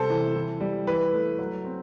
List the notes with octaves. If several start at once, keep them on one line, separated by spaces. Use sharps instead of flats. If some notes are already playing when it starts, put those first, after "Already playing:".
Already playing: C3 G3 A4 C5
E3
E3
G3
E3 B4
A3
F#3
C4